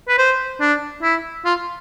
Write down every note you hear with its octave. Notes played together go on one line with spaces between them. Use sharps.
B4
C5
D4
E4
F4